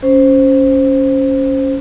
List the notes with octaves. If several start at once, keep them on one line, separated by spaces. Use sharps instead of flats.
C#4 C5